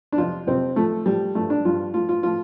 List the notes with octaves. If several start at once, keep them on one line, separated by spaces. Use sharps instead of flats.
D4
F2 C3 F3 F4
F2 C3 F3 C4
A2 F3 A3
A2 F3 G3
G2 F3 A3
D4
G2 F3 F4
A2 F3 F4
F4
A2 F3 F4